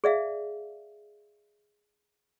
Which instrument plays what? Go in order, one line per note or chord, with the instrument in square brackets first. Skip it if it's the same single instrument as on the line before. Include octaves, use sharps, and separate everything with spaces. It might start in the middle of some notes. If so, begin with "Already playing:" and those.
[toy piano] G#4 D5 E5 F5